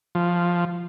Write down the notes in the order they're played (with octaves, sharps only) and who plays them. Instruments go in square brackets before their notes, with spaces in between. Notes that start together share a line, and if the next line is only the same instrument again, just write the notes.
[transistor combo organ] F3